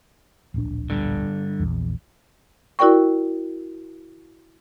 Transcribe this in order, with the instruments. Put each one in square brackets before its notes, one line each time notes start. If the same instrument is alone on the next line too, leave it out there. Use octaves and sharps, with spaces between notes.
[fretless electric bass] D1 A#1 D4
[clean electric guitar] G2 D3
[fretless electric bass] A#1 E2
[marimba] E4 F#4 A#4 D5 G5 C#6